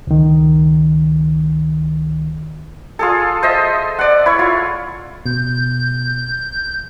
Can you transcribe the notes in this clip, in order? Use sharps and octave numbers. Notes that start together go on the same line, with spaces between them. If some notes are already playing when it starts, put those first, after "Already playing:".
C#2 D#3
F4 G#4 A4
C5 D#5 E5
D5 F#5
E4 C#5
F4
B2 G6